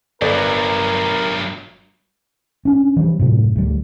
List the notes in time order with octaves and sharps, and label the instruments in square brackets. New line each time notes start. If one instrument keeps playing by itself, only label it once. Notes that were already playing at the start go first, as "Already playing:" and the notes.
[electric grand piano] G1 [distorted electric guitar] G2 F#3 [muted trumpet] A#4 [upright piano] B4 D5
[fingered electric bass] C#4 D4
E3 G3
F#2 A2 C3
D2 G3